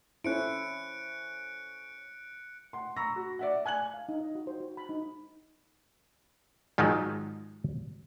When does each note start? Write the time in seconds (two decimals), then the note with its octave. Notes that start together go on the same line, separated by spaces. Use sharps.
0.24 C#4 E4 A4 C5 F#6 C#7 D7
2.73 F#5 C6
2.96 A#5 B5 C#6 E6 A#6
3.16 F#4
3.39 D5 E5 F#5
3.66 G#5 F#6 G#6 F#7
3.94 F5
4.09 D#4
4.21 D#5
4.35 F#4
4.47 C5
4.60 F#4
4.77 B5
4.89 D#4
6.78 G#2 D#3 F3 F#3 G#3